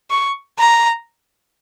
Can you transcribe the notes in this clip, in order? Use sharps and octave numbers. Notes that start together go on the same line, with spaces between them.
C#6
A#5